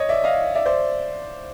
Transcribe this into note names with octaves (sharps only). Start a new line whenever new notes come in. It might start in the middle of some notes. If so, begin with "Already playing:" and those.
Already playing: C#5 D#5
D5 E5
D#5 F5
D5 E5
C5 D5